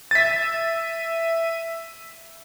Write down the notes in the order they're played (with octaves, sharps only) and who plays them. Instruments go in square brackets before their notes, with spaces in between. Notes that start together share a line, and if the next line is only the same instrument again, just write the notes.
[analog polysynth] E5 D#7 [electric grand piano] A6 B6